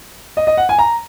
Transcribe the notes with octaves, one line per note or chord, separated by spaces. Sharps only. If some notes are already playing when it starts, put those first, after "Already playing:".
D#5
D#5
F#5
G#5
A#5